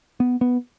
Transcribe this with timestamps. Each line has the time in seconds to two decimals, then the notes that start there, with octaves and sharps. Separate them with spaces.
0.20 B3
0.41 B3